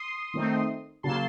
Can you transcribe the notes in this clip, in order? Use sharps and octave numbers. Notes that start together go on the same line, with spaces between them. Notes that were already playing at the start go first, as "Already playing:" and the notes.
Already playing: C6 D#6
D#3 A3 C4 D#4
C#3 F#3 A#3 A5 C6